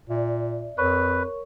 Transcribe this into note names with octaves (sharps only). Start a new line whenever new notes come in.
A#2 D5 E5
F2 A#4 B4 C#5 C#6